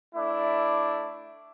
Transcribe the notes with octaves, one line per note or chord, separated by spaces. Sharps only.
A3 D4 E4